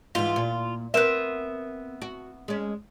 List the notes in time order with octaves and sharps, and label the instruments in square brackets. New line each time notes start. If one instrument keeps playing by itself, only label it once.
[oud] G#2 E3 [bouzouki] F4
[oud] A#2
[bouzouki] B3 E5 [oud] C4 A#4 C5
[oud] F#4
G#3 C#4